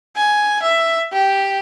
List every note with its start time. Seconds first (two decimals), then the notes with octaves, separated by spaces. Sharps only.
0.17 G#5
0.63 E5
1.13 G4